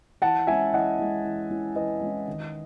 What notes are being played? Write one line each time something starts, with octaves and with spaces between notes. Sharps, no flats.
E3 F#5 A5
G#3 C#4 E4 E5 G#5
E3 D#5 F#5
G#3 C#4 E4
E3
G#3 C#4 E4
E3 B4 D#5
G#3 C#4 E4
D#3